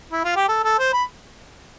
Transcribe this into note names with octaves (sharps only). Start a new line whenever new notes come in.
E4
F4
G4
A4
A4
C5
B5